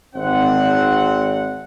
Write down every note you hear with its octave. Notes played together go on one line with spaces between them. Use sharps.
G#1 C4 F#5